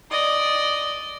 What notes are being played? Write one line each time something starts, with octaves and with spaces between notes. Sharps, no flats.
D5 D#5